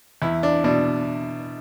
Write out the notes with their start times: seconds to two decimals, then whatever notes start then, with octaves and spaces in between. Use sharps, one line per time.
0.22 E2 E4
0.43 D4
0.64 B2 D4